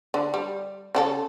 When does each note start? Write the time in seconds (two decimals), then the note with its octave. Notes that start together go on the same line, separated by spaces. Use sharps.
0.14 D3
0.34 G3
0.95 C#3 F#4 A4